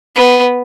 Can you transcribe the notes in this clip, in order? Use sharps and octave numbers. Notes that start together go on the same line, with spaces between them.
B3